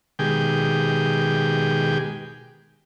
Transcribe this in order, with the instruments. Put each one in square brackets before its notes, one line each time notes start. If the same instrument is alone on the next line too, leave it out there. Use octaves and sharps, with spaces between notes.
[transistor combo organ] B2 D#3 G#3 G4 G#4 G5